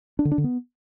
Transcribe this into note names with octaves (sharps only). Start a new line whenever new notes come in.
D4
D3
D4
D3
B3